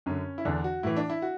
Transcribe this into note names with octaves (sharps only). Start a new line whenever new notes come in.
F#2 D3 C#4
E4
E2 D3 D4
F#4
A2 E3 E4
D4
E4
F#4